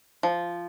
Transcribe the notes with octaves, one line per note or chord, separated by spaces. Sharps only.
F3